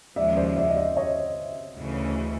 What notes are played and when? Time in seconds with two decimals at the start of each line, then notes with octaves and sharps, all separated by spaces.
0.16 D#2 C#3 F3 G#3 D5 E5
0.37 C5 D5
0.57 D5 E5
0.70 D#5
0.76 D5 E5
0.97 C#5 D#5
1.77 D2 C#3 E3